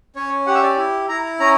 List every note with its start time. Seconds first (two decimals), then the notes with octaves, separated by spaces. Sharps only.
0.16 C#4 C#5
0.47 G4 F#5
0.54 E5
0.63 D5
0.78 E4
1.09 E4 A#5
1.40 C#4 A#5